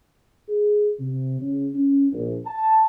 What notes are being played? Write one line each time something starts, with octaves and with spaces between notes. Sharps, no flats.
G#4
C3
C#3
C#4
A#1
A5